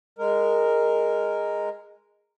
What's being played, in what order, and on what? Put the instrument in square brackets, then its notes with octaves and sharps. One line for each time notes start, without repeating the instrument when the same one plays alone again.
[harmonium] G#3 A#4